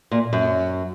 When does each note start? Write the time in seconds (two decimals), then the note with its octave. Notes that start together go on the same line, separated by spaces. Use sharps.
0.11 A#2
0.33 F#2